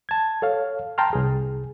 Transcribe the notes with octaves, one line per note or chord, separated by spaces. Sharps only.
A5 G#6
A4 C#5 F5
G5 A5 A#5 C6 F6
C2 G#4